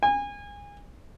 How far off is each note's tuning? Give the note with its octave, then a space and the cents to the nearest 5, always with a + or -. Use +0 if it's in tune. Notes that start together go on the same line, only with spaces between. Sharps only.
G#5 -30